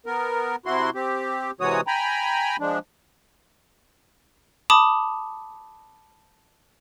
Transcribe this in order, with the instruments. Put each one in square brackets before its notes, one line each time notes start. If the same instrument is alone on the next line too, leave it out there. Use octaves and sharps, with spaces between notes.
[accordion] B3 A#4
C3 E4 F#4 C6
C4 G4
C3 E3 G#3 F#4 C#5 D#6
G5 G#5 A#5 B5
F3 G#3 D4
[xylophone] A5 B5 D6 D#6